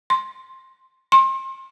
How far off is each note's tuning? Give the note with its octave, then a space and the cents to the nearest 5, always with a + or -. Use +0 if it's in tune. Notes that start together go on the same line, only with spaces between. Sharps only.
C6 +10
C6 +35